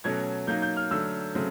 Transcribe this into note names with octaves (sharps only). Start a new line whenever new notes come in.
B2 F#3 A3 C#4 G#6
F#3 A#3 D#4 G6
G6
F6
D3 F#3 A3 E6
C#3 F#3 A3 C4